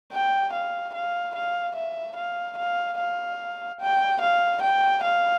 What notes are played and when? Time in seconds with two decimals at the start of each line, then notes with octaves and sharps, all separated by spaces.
0.12 G5
0.53 F5
0.94 F5
1.35 F5
1.76 E5
2.16 F5
2.57 F5
2.98 F5
3.81 G5
4.21 F5
4.62 G5
5.03 F5